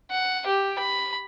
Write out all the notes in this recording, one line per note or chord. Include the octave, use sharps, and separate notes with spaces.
F#5
G4
B5